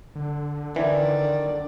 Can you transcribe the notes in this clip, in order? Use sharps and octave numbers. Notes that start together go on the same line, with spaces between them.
D3
D#3 E3 D5